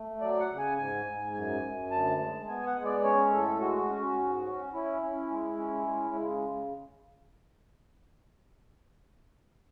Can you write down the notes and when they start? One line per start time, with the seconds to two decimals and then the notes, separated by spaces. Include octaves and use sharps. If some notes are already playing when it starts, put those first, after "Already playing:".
Already playing: A3
0.21 F#3 D5
0.40 F#5
0.49 C#3
0.58 G#5
0.78 G#2 G#5
1.05 G#2
1.34 F#2 G#5
1.62 F#2
1.91 D2 A5
2.19 G#3
2.48 B3 G#5
2.66 F#5
2.75 G#3
2.85 D5
3.04 C#4 C#5
3.32 A2 A4
3.60 G#3 F#4
3.89 C#4
4.18 G#2
4.45 C#4
4.73 C#4 E4
5.02 C#4
5.31 G#3
5.58 C#4
5.87 G#3
6.15 C#3